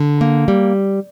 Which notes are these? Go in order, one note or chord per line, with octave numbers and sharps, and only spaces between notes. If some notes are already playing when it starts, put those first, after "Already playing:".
Already playing: D3
A#3
G3